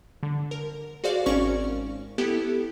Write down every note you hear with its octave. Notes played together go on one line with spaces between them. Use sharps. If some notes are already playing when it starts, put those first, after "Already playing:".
D3
A#4
F#4 G#4 C5 D5 F5
G#1 C#4 A#4 D5 C#6
B3 E4 G4 A4